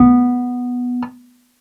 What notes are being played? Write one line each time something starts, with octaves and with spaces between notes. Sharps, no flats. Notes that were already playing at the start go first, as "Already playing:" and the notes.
Already playing: B3